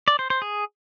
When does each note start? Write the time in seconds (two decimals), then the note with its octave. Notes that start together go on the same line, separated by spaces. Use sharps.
0.08 D5
0.19 C5
0.30 C5
0.42 G#4